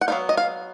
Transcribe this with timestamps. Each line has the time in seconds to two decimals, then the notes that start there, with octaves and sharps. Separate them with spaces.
0.01 F#5
0.08 F#3 B3 D#4 F5
0.29 D#5
0.37 F5